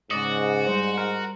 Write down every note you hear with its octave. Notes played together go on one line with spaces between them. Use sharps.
G#2 C#3 F#4 D5 D#5
G3 C5
A#4